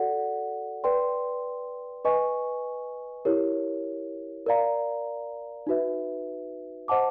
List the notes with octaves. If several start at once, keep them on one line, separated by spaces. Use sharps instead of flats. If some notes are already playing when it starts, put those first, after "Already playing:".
Already playing: F#4 A4 D5 F#5
B4 D5 G5 C6
B4 D#5 G#5 C#6
E4 G4 A#4 C#5
A#4 D5 F5 A#5
D#4 F#4 B4 E5
C5 D#5 F#5 A5 D6